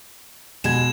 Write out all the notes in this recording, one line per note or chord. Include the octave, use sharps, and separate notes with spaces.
B2 G#3 G#6 E7